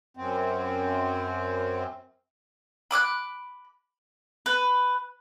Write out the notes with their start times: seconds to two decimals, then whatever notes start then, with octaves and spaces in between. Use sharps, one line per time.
0.17 F#2 C4
2.91 B5 D6 F6 F#6
4.46 B4